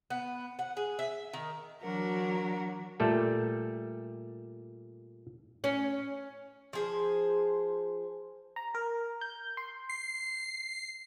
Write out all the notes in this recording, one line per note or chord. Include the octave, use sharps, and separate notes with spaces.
B3
F#5
G#4
E5
D#3
E3 F#3 D4 F#4 A#4
A#2 G3 A3 A4
C#4
F3 G#4 C5
A#5
A#4
G6
C6
C7